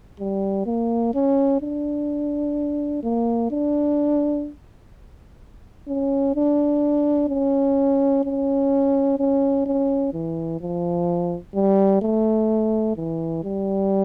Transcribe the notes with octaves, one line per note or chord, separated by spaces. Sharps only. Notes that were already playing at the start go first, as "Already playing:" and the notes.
G3
A#3
C#4
D4
A#3
D4
C#4
D4
C#4
C#4
C#4
C#4
E3
F3
G3
A3
E3
G3